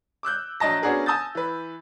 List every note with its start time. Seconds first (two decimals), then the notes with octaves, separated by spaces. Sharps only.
0.23 D6 E6 F#6 G6
0.60 A#1 F#3 D#5 A5 A#6
0.82 B3 C#4 D4 F#4 G#4 A#4
1.06 G#5 A5 D#6 E6 G6 A6
1.35 E3 B4